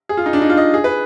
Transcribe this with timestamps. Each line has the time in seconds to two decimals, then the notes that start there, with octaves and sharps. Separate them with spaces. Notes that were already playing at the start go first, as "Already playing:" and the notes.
0.09 G#4
0.17 F4
0.26 D#4
0.33 D4
0.42 D#4
0.50 F4
0.57 D#5
0.74 G#4
0.84 B4